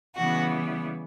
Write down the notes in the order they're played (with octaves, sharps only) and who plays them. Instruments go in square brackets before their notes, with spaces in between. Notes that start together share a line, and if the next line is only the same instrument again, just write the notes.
[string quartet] C#3 E3 G3 B3 F#4